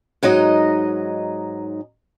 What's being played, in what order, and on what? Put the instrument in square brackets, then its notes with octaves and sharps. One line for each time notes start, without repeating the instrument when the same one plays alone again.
[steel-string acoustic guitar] G#2 F#3 D#4 D#5